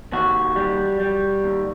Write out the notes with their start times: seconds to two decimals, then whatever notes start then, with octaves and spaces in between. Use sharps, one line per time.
0.13 D#2 F#4
0.56 G3
1.00 G3
1.44 D#2